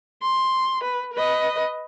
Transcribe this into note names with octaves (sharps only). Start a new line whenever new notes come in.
C6
B4
B4 D#5